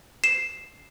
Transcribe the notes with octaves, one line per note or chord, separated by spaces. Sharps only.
C7 E7